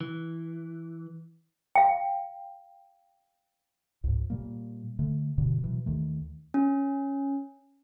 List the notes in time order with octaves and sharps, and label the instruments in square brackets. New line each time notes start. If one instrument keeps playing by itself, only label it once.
[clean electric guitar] E3
[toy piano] F5 G5
[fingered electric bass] C#2 G#2
A#2 G3 A#3
D3 A3
D#1 G2 B2 D3
B2 E3 F#3
D#2 D#3 A3
[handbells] C#4